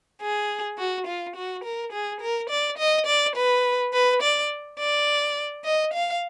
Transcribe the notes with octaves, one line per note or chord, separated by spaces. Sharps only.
G#4
F#4
F4
F#4
A#4
G#4
A#4
D5
D#5
D5
B4
B4
D5
D5
D#5
F5